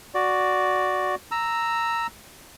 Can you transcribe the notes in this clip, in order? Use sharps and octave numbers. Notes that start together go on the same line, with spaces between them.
F#4 D5
A#5 E6